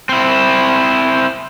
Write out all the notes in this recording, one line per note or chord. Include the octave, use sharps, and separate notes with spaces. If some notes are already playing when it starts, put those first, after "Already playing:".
C4 E4